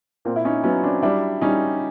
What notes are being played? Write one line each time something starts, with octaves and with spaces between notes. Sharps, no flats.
A#2 A#3 C4
E4
C#4 D#4
F#3 B3 C#4
C4 D4
G3 D4 E4
G3 C#4 D#4